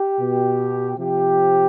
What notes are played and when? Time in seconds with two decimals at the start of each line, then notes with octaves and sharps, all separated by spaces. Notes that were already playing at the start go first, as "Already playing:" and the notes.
Already playing: G4
0.20 B2
0.98 C3 F3 G4